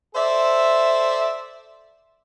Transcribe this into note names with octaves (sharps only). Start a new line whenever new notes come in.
A4 C5 D5 E5